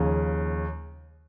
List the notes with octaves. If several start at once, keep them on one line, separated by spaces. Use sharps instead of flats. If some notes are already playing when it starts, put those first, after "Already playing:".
Already playing: D#2 C#3 F3